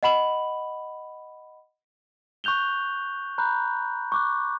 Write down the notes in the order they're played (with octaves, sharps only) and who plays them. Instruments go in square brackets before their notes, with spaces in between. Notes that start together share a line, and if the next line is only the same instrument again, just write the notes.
[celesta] D#5 F#5 B5 F#7
[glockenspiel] C#6 F#6 G6 F7 G7
A#5 B5 F#6 G6
C#6 D6 F#6